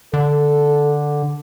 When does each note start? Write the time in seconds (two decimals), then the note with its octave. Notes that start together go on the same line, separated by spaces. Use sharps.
0.14 D3 A4